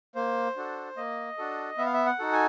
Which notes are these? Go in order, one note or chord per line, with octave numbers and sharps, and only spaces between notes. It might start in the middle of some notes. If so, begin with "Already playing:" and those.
A#3 C5
D4 F#4 A4
A#3 D#5
D4 F#4 A4
B3 E5
F5
E5
F#5
D#4 F#4 A4
G#5